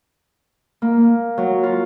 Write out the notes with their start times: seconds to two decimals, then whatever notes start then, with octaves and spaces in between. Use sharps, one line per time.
0.82 A#3
1.38 F#3
1.63 F4